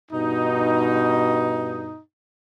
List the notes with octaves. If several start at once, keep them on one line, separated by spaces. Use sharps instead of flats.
G2 B2 D#4